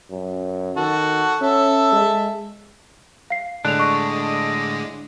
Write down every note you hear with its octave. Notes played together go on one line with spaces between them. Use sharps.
F#2
D#3 F#4 A4
C#4 A4 E5
G#3
F5 C7
A2 D3 G#3 D4 F#6 F7
D#5 C#6